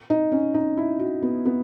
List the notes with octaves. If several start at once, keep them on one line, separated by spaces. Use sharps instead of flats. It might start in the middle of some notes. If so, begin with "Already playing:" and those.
D#4
C#4
D#4
E4
F#4
B3
B3